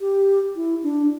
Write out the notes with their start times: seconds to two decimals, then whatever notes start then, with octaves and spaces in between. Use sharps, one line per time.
0.01 G4
0.56 E4
0.83 D4